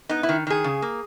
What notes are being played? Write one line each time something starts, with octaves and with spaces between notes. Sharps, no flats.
B3 D#4
E4
D#3
D#3 G#4
C#3
A#3